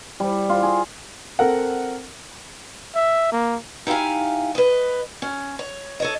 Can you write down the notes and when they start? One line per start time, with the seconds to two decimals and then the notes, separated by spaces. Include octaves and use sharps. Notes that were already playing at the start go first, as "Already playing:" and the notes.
0.20 G3
0.49 F4
0.63 G#4
1.39 C4 A4 A#4 F#5
2.95 E5
3.32 A#3
3.87 D#4 E4 G4 F5 G#5
4.55 B4 D#5
5.22 C#4
5.59 C#5
6.00 A4 C#5 D#5